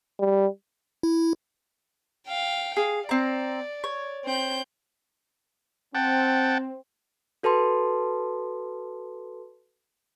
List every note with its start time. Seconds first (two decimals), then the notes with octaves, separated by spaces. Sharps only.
0.19 G3
1.03 E4
2.26 F5 G5
2.77 G#4 F5
3.09 C4 D5 A#5
3.84 C#5
4.25 C4 G6
5.95 C4 F#5 G5 A5
7.43 F#4 A4 B4 A5 C6